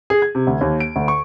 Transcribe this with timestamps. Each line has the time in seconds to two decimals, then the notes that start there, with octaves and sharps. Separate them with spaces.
0.10 G#4
0.22 G#6
0.35 C3
0.47 D2
0.61 D#2
0.80 D7
0.96 D2
1.08 C#6